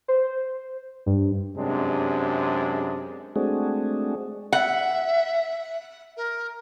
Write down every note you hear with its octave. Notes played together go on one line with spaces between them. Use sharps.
C5
G2
F#2 C3 G#3 D4
G#3 A3 C4 D4 F#4 G#4
E5 F#5
A#4